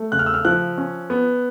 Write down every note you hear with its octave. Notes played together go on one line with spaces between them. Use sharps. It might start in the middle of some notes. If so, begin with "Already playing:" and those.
Already playing: A3
C#3 F#6
F6
E6
F6
F3 F#6
C#4
B3